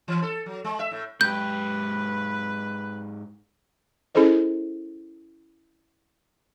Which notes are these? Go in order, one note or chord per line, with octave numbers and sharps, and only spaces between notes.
E3
A4
F#3
G#3
E5
A2
G#2 G4 B4 G6
C#4 E4 G#4 A4 C5 D#5